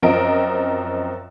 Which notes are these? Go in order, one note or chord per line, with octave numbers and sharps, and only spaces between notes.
F#2 F3 C4 A#4 D#5 D7